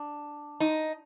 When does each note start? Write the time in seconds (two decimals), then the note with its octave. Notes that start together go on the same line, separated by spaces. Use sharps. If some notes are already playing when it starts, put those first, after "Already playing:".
Already playing: D4
0.60 D#4